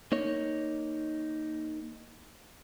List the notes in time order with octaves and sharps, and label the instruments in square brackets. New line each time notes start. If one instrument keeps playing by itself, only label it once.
[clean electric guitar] A#3 D#4 C#5